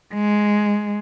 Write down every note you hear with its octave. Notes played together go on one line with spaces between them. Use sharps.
G#3